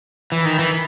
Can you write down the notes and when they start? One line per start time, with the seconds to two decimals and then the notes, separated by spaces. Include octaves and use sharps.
0.32 E3
0.45 D#3
0.59 E3